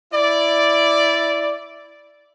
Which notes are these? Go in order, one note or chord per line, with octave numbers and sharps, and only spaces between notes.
E4 D5